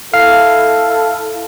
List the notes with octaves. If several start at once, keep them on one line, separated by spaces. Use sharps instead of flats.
E4 A4 F5